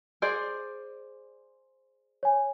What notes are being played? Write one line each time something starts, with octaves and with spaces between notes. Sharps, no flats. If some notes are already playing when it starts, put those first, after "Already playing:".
G#4 C5 D5
C#5 G#5